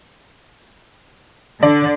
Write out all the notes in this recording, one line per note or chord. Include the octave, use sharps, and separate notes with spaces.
D3 D5